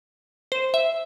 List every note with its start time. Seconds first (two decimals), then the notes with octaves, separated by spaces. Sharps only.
0.52 C5
0.74 E5